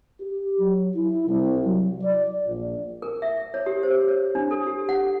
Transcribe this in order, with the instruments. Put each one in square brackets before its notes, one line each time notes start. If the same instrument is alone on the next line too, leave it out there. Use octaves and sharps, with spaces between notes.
[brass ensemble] G4
F#3
E4
C2
F#3
D5
A#1
[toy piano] A#4
E5
C#5
G4
C5
C#5
D4
A4
G4
F#5